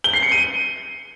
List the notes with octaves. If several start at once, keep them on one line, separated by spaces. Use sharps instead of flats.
G7
C7
C#7
D#7